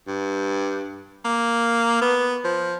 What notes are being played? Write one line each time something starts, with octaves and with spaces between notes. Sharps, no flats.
G2
A#3
B3
F3